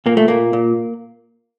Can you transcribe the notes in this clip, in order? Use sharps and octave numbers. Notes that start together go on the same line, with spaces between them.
A#2 A#3
A3
A#2 A#3
A#2